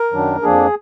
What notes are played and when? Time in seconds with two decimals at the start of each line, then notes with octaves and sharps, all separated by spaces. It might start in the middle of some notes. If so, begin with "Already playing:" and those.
Already playing: A#4
0.12 F#2 D#3 F#3 D4
0.42 F2 F3 A#3 D4 G#4